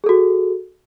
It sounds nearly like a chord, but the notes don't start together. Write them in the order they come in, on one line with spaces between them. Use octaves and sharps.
G#4 A4 F#4